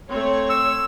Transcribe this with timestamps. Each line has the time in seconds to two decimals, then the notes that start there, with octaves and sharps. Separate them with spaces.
0.10 A3 C4 C#5
0.49 E6